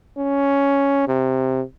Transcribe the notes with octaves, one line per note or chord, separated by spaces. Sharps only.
C#4
C3